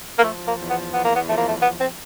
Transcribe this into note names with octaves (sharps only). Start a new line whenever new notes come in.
A#3
F3 A3
A#3
E2
B3
E2 B3
A#3
B3
F3 A3
A#3
A3
F3 B3
C4